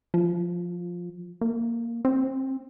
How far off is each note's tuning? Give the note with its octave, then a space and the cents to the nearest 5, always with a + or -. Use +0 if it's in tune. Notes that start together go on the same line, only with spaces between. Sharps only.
F3 +5
A#3 +0
C4 +30